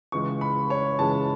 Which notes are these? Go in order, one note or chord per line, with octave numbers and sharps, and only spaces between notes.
C#2 C#3 E3 G#3 C#6
B5
C#5
C#2 C#3 E3 G#3 A5